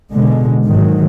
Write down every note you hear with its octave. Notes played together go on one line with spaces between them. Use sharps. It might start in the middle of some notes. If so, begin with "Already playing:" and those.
B2 D3 G#3
G#2 D#3 F#3